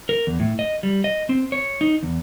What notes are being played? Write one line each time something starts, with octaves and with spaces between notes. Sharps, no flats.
A#4
E2
A2
D#5
G3
D#5
C4
C#5
D#4
E2